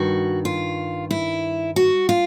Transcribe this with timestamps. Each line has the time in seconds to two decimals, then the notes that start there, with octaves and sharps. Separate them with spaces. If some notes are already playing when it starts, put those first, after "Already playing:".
Already playing: G2 D#3 F#4
0.45 F4
1.11 E4
1.76 F#4
2.09 F4